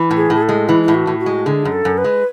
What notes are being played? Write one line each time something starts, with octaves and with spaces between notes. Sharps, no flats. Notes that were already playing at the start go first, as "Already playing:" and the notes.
Already playing: E3
A2
G#4
A2
G#4
A4
G#3
E3 E4
E4
A2
F#4
A2
F#4
G#3
D3 G#4
F#2
A4
F#2
B4
G#3